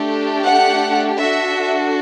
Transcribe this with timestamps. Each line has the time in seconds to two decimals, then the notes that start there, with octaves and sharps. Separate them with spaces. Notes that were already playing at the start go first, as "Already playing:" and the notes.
Already playing: A3 D4 G4
0.45 F#5
1.19 D4 F#4 A4 E5